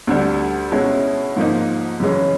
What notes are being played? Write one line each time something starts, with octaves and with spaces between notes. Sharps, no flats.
D2 D3 G3
B2 G#3 C#4 E4
G#2 F3 A#3 D#4
F#2 C#3 E3 G#3 C#4